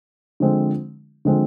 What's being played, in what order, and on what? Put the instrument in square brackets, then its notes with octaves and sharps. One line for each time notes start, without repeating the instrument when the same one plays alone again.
[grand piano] D3 F3 G#3 C4
D3 F3 G#3 C4